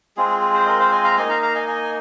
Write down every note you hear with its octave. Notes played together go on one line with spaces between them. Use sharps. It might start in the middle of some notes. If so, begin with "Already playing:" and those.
G#3 C4 F4 G#4
G#4
G#4
G#4 C5
A#4 D#5
C5 F5
D#5 G#5
F5 A#5
A#3 D#4 D#5 G#5
F5 A#5
F5 A#5
D#5 G#5
D#5 G#5